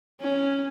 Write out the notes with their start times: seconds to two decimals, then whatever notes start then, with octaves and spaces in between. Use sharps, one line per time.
0.22 C#4